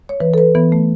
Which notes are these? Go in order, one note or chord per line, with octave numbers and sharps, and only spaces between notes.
C#5
E3 B4
A4
B4
E3 B3
A3